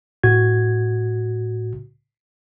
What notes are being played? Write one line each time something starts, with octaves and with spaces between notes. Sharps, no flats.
A2 F#4 G#6